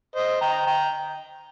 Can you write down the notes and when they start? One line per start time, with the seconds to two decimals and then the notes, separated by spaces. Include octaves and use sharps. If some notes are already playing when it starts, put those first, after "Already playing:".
0.16 C5 D#5
0.41 G5 A#5
0.67 G5 A#5